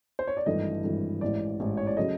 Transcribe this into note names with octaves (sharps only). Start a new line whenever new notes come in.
C5
C#5
D5
G#1 G2 E3 A3 D#5
G#1 G2 E3 A3
A1 G#2 E3 D5
A1 G#2 E3
C#5
D5
C#3 F#3 A3 D#5